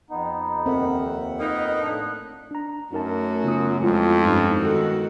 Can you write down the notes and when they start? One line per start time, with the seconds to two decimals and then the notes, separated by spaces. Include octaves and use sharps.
0.10 F2 B3 D#4
0.66 D#2 C4 A#4 E5 F#5
0.98 F2
1.40 A#3 B3 D#4
1.78 A2 D4 F#6
2.51 D4 A#5
2.93 F#2 A3 D#4 F#4 A#4 A5
3.44 C#3 B3 F4 D#6
3.81 F2 G#3 B3 E4 F4
4.25 G2 C#4 D#4
4.60 D#3 F#4 A4